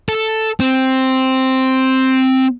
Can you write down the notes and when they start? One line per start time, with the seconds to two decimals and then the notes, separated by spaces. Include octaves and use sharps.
0.09 A4
0.60 C4